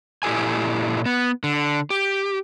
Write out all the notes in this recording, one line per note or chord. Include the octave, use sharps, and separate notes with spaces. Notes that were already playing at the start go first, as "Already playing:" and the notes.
A#2 E4 G4 A4 G#5
B3
D3
G4